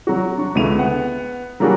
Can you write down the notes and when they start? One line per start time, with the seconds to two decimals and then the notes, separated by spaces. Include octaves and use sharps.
0.07 F#3 F#4
0.38 D4 C#6
0.55 C#2 D3 B3 E4 D#7 F7
0.79 B3 F#5
1.60 F#3 G3 A#3 D4 F#4 G#4